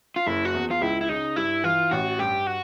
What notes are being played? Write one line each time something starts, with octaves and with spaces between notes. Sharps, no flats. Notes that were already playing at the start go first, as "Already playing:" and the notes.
F4
F#1 E4
F#4
E2
F4
C#2 E4
E4
C#3 D#4
G2 E4
E3 F4
A1 F#4
G2 G4
F#4